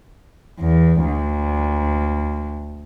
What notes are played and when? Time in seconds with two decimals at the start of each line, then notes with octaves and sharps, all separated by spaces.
0.60 E2
1.06 D2